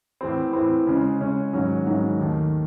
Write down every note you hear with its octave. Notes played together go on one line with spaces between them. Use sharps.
A2 E3 C4
A2 E3 C4
C#3 G#3 C#4
C#3 G#3 C#4
G#2 D#3 F#3 C#4
G#2 D#3 F#3 C#4
D#2 D#3 A3